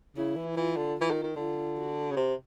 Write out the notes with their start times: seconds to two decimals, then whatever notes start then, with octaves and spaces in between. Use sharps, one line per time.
0.16 C#3 E4
0.36 E3
0.56 E3 F4
0.76 D3
0.97 E3 F4
1.10 D#3
1.23 D#3
1.36 D3 F4
1.77 F#4
2.11 C#3
2.16 C3